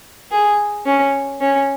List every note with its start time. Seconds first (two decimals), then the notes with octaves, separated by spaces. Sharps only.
0.31 G#4
0.86 C#4
1.41 C#4